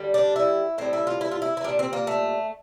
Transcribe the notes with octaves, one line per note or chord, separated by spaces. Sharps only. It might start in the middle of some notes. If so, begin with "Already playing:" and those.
Already playing: D3 G3
D4
E4
A2 G3 C4
E4
F4
E4
F4
E4
E4
A#2 G3 D4
C4
A#3
A3